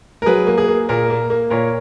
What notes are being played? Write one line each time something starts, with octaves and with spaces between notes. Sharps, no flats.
A#4
F#3 G#4 B4
A#3
G#4
A#3
A#2 A#4
A#3
A#3
A#2 A#4 C#5